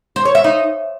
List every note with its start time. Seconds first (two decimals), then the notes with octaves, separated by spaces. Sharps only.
0.16 C5
0.25 C#5
0.35 E5
0.44 D#4